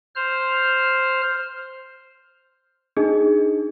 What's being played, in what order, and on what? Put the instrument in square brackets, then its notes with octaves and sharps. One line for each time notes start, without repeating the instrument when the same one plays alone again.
[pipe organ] C5 F6
[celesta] D4 D#4 G#4 D#5